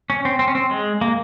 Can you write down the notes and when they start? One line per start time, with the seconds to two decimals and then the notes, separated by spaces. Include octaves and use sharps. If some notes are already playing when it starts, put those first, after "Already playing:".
0.10 C#4
0.25 C4
0.39 C4
0.48 C#4
0.55 C4
0.71 G#3
1.01 A#3